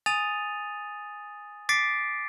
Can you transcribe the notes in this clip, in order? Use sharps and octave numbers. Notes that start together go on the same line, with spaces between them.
G#5 D#6 A6 D#7 F7
D6 A6 B6 C7 D7